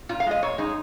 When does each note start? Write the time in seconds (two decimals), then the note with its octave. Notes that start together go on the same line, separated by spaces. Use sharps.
0.09 A#2 F4
0.20 F5
0.26 G#3 D#5
0.43 A#2 C#5
0.58 G#3 D#4